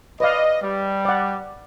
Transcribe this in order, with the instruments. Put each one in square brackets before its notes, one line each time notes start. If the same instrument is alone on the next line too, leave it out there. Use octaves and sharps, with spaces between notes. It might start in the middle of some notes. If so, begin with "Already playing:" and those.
[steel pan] B4 D5 F5 [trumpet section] D#5
[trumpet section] G3
[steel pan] D5 F#5